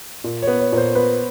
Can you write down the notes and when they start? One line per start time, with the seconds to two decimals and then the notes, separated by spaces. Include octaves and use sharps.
0.24 A#2
0.42 C#5
0.47 B3
0.60 C#5
0.72 A#2
0.78 C5
0.95 B3 B4